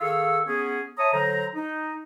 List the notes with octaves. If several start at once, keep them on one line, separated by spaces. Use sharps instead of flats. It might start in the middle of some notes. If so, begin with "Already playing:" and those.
D#3 G#4 A4 F5 C#6 E6
B3 C#4 G#4
C#5 E5 A5 A#5 D#6
D3 F#3 C5 A#5
D#4